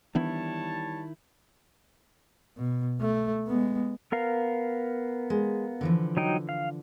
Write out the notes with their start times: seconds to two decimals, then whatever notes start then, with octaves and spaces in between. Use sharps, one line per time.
0.15 D#3 E3 G3 B3 D4 E4 C#5 A5
2.57 B2
3.01 A3
3.47 G#3 B3
4.12 B3 A#4 F5
5.30 G#3
5.81 D3 E3 F3
6.17 F#3 D#4 G5
6.49 F5